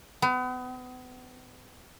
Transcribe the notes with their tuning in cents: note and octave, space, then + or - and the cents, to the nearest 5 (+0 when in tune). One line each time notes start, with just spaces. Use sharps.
B3 +35